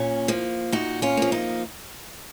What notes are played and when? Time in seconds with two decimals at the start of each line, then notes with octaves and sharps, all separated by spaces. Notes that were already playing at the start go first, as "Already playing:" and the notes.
Already playing: A#2 C#4
0.28 F3 A#3
0.72 A#2 D#4 F#4
1.02 C#4 F4
1.17 F3 A#3
1.32 D#4